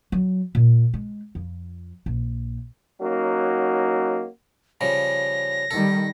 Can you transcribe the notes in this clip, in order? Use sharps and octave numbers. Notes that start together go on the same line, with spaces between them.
F#3
A#2
G#3
F2
A#1
F#3 A#3 C#4 D#4 F#4
C#3 F3 G3 A#6
D#3 G3 A4